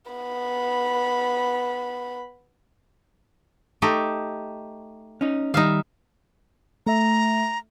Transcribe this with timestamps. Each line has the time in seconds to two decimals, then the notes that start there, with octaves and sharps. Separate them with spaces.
0.11 B3 B5
3.82 A3 D#4 G4
5.21 C#4 D#4
5.54 D#3 G3 D#4 E5 F5
6.87 A3 E5 A#5